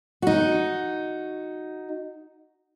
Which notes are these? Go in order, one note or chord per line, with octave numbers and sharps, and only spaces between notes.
D#4 F#4